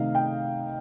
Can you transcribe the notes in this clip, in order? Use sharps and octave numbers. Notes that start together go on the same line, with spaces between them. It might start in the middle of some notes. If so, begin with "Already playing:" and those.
Already playing: C3 D#3 A3 D#4 D#5 F5
G5